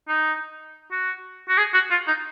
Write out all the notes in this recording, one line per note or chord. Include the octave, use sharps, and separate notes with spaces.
D#4
F#4
F#4
G#4
F#4
F4
D#4